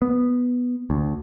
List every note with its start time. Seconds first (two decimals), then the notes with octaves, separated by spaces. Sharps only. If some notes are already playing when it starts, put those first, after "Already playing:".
0.02 B3
0.90 D2